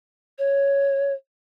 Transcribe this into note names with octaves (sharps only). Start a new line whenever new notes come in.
C#5